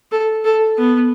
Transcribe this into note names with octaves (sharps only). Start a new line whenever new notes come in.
A4
A4
B3